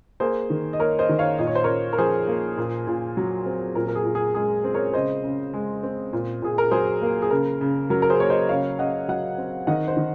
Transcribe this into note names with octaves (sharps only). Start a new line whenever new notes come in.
A#3 G#4 C5
D#3
D#5
A#3 A#4 C#5
C5 D#5
D#3
C#5 F5
A#2 D#5
C#5
C5
A#2 A#4 C#5
A#4
F3 G#4 C5
A#3
A#2
A#2
F#3
C4
A#2 A#4
A#4
G#4
A#2
G#4
G#3 G#4
C4
A#4 C#5
C#3 C5 D#5
C#3
G#3
C4
A#2
A#2 G#4
A#4
F#3 G#4 C5
A#3
G#4
C#3 A#4
C#3
F#3 A#4
A#4
G#4 C5
A#3 C#5
C5 D#5
C#3 C#5 F5
C#3 D#5 F#5
F#3 D#5 F#5
C4
D#3 D#5 F#5
C5 D#5
D#3